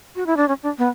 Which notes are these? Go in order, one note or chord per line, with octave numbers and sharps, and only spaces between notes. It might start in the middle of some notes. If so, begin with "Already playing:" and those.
F#4
E4
D4
C#4
D4
B3